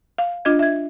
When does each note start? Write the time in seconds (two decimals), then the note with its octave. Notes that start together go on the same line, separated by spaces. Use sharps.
0.18 F5
0.45 D4 F4 D#5 G#6
0.59 E5 G#6